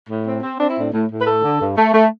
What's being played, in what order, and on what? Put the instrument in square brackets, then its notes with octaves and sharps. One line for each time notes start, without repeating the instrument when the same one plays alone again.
[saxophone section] A2
C4
C4
C4 D4
E4
A2 D4
A2
A2
B4
A3 A4
D3
G2
A3
A3